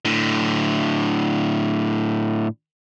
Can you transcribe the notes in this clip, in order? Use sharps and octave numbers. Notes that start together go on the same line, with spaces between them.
A2 D3